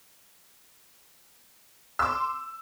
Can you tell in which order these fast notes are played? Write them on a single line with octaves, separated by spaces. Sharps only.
E6 D6 C6